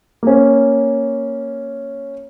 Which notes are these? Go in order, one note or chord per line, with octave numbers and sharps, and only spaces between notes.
A#3 C#4